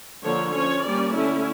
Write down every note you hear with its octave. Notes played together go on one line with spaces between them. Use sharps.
D3 F3 A#3 C#5
F3 C#4 C#5
G3 A#3 C#4 D5
D3 A3 C#4 E4